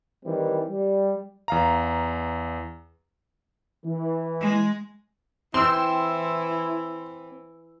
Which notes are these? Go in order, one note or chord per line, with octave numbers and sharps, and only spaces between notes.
D#3 E3 G3 C4
G3
E2 F5 A#5
E3
G#3
E3 C4 E4 C6 E6